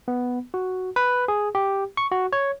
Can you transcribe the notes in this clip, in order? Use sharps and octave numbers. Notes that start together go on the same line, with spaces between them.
B3
F#4
B4
G#4
G4
C#6
F#4
C#5